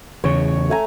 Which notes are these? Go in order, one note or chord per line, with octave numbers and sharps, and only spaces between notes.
E2 C#3 C#5
A3 G#5 A#5